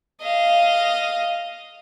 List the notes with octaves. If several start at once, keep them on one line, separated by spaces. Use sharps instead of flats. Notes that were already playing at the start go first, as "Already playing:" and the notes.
D#5 F5